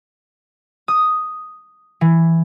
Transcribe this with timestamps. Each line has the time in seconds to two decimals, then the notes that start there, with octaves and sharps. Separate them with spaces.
0.88 D#6
2.01 E3